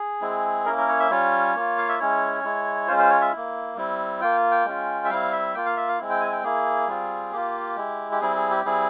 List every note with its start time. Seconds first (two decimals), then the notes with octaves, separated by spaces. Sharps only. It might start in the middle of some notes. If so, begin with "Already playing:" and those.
Already playing: G#4
0.21 G#3 C4 E4
0.65 A#3 C#4 E4 A#4
0.78 A#4
0.88 C#5
0.99 E5
1.10 G3 C#4 F4 C#5
1.55 A#3 F4
1.78 F5
1.89 E5
1.99 G#3 C#4 E4 C#5
2.44 G#3 E4
2.88 G#3 C#4 F4 C5
2.99 C5
3.10 C#5
3.21 E5
3.32 A#3 E4
3.76 G3 C4 E4
4.21 A#3 F4 G5
4.51 G5
4.65 G#3 C#4 F4
5.05 E5
5.10 G3 C4 E4 F5
5.32 E5
5.54 A#3 F4 G5
5.66 F5
5.77 E5
5.88 F5
5.99 G#3 C4 E4
6.09 G5
6.21 G#5
6.32 G5
6.43 A#3 E4 G#4
6.87 G3 C4 F4
7.32 A#3 F4 G4
7.76 G#3 E4
8.12 G4
8.21 G3 C4 E4 G#4
8.36 G#4
8.51 G4
8.65 G3 C4 E4 G#4